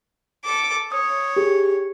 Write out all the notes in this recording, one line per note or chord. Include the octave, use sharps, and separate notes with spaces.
A4 D6
C#5 D#6
G4 G#4